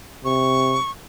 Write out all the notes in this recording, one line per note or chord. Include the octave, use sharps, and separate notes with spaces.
C3 C#6